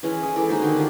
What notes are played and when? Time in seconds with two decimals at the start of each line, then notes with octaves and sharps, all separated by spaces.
0.03 E3 G#3 C#4
0.23 G#3
0.36 E3 A4 D5
0.49 G#3 D#4 F#4 C5
0.62 D3 D#3
0.76 D4 F4 G4